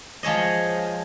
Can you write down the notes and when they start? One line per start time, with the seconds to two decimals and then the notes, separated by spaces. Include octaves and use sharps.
0.23 F3 G#3 C#5 D#5